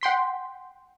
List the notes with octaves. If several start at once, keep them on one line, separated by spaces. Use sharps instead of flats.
F#5 G5 C6 B6